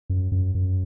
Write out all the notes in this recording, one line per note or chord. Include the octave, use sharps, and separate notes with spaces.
F#2
F#2
F#2